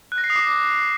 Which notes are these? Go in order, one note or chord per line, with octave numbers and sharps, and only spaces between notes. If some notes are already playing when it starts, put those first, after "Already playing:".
F#6
A#6
C7
D#6
D6